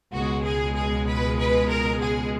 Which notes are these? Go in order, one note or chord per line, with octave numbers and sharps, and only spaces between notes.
C#2 B2 G#3 F#4
G#4
G#4
B4
B4
A#4
G#4